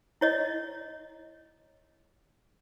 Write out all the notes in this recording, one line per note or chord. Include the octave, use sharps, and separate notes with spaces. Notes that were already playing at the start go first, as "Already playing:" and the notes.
E4 C#5 D#5